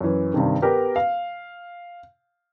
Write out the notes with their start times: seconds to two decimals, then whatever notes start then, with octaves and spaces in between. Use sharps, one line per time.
0.01 F#2 E3
0.34 G2 C3 D#3
0.62 B3 G4 A#4
0.96 F5